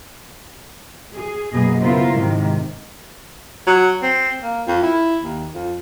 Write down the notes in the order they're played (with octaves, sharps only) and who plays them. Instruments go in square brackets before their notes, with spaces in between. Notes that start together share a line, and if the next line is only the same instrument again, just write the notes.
[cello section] G#4
F#2 B2 A#3 G#4 D#5
C#3 B3 E4 F4 A#4 C5
G#2 C3 D#3
[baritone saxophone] F#3
C4
A#3
F2
E4
D#2
F2